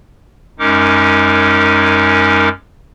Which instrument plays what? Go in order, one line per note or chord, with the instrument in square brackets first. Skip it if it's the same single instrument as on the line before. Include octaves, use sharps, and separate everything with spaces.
[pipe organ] F#2 G#3 C#4 D#4 A#4 D6